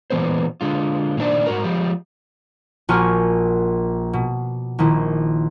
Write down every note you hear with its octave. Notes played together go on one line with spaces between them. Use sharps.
A#2 E3 G#3 B3 C5
D3 G#3 F4
A#2 D#3 A3 D4 C5 D5
G#2 F#4 A#4
F3 G#3 G4
A#1 F#4 A#4 G#5 C#6 F6
B2
A#1 D#3 E4